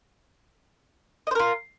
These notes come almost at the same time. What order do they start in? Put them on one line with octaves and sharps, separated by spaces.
D#5 C5 A#4 F4